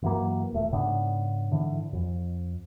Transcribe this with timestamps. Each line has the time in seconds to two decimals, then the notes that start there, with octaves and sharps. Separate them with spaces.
0.02 G2 E3 F#3 A#3
0.53 D#1 A3
0.72 G#2 C#3 B3 D4
1.51 G#2 D3 E3
1.93 F2